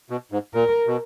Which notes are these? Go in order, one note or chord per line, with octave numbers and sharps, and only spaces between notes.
B2
G#2
A#2 A#4
B2